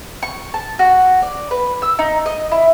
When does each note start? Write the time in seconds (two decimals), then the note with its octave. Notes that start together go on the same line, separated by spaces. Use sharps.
0.23 C#6
0.54 A5
0.79 F#4
1.22 D5
1.51 B4
1.82 E6
1.99 D#4
2.26 D#5
2.52 E4